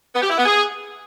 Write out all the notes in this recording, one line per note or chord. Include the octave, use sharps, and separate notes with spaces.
B3
G4
E4
B3
G#4